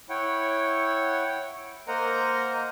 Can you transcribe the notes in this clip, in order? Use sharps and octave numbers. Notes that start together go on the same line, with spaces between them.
E4 C#5 F#5 G5
A#3 A#4 C5 D#5 F#5 A#5